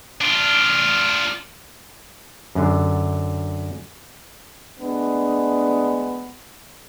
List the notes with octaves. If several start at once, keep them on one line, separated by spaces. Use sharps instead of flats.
D4 F4
F#2 D3
D2 G#3 B3 D4